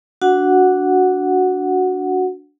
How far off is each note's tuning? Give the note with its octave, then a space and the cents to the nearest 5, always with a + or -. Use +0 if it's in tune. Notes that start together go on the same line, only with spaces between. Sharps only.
D4 -10 F#4 +0 F#5 +0